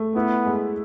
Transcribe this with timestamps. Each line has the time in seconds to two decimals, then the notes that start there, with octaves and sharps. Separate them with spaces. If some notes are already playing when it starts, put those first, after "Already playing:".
Already playing: A3
0.15 B3 E4
0.45 G#3